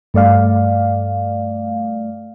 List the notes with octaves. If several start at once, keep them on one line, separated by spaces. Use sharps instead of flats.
G2 A3 D5 F5